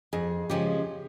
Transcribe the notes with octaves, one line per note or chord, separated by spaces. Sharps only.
F2 G#4
C#3 F3 G#3 C#4 G4